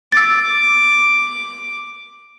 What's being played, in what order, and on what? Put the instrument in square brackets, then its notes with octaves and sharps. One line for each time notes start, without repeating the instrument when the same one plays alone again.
[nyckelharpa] D6 [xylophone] E6 A6